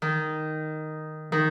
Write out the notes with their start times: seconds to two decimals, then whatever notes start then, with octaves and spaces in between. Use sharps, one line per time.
0.02 D#3
1.32 D#3